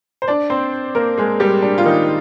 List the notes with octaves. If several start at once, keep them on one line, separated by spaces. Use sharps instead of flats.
C5
D4 D5
C4 C5
A#3 A#4
G#3 G#4
G3 G4
D4
F4
D#3 D#4